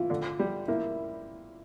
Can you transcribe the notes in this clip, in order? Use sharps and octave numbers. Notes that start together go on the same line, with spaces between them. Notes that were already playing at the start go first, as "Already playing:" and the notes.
Already playing: E3 F4
D3
G3
A#3 E4